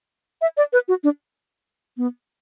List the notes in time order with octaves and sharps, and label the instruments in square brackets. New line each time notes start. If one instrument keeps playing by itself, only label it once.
[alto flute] E5
D5
B4
F#4
D4
B3